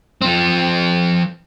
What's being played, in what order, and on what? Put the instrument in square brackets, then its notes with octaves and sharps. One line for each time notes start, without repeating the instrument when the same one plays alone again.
[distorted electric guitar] F3 C4